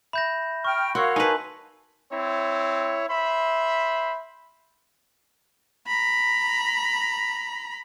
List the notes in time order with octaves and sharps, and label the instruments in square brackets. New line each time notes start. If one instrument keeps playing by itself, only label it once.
[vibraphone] E5 [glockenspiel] B5 G6 A#6
[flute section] G5 F6 [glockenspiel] C#6
[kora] F#4 [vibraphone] A#4 F#5 [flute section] C#5 F5 [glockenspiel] C6 C#6 E6
[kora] D#4 B4 [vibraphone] A#4 A5 [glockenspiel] G#5 F#7
[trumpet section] C4 E4 C#5
C5 E5 B5
[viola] A#5 B5